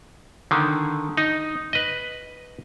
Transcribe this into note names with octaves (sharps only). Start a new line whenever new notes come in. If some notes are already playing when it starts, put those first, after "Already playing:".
D3 D#3
D#4
B4 D#5